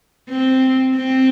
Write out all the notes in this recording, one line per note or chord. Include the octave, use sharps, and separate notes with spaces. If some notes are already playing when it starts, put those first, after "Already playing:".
C4
C4